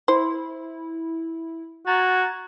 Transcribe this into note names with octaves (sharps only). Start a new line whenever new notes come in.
E4 C5
F#4 A#5 G#6 A6